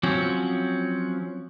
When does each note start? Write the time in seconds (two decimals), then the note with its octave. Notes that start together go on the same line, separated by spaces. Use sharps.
0.03 F3 F#3 C4 C#4